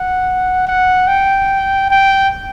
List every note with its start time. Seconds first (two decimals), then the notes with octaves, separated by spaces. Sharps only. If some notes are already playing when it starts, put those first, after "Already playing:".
Already playing: F#5
0.68 F#5
1.08 G5
1.91 G5